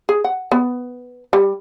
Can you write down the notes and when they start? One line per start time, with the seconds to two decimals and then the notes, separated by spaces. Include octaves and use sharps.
0.09 G#4
0.24 F#5
0.52 B3
1.33 G3